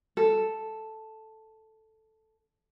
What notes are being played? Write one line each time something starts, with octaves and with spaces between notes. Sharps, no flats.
A4